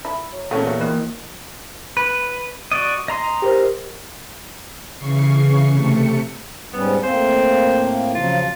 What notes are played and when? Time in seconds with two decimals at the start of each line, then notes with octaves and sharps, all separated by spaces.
0.05 E4
0.32 F#3
0.51 E2 A#2 F#3 A3 B3 C#4
0.67 F#4
0.80 D#3 E3 A#3 E4
1.97 B4
2.72 F#4 D5 D#5
3.08 D#5 A#5 C6
3.42 G4 A#4 C5
4.97 C#3 E3 C#6 C7
5.72 C3 A3 C#7
6.73 G#2 G3 B3 C#4
7.04 A2 A#3 C4 C5
8.15 C#3 F3 F#3 F4